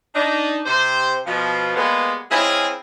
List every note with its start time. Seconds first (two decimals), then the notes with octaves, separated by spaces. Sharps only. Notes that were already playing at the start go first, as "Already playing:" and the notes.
0.14 D4 D#4
0.66 C3 C5
1.26 B2 F3
1.75 G3 G#3 A#3 B3
2.30 G#3 C4 C#4 E4 F4 G#4